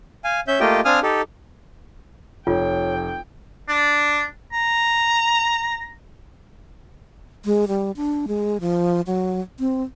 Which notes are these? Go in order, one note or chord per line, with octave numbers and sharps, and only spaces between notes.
F5 G#5
C#4 E5 G6
A3 A#3 F4 G4 D#5 G5
C4 D4 F5 G#5 D#6 F6
D#4 G4 A4
F1 F4 C#5 G5
D4
A#5
G#3
G3
D4
G#3
F3
F#3
C4